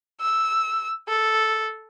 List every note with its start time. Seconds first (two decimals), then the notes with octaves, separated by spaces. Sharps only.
0.21 E6
1.08 A4